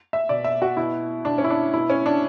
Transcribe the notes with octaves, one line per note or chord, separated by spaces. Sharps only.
E5
B2 D5
E5
F#4
B2 E4
B2 D4
C#4
E4
D4
B2 E4
C#4
D4